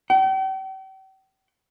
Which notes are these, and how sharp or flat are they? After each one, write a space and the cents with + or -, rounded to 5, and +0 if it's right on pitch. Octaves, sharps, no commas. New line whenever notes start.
G5 -40